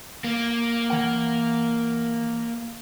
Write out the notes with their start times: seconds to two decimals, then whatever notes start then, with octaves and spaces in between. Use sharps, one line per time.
0.24 A#3
0.89 E3 A#4 F#5